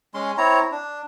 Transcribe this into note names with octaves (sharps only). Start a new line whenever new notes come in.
G#3 C#4 C6
C4 E4 C#5 A#5
D4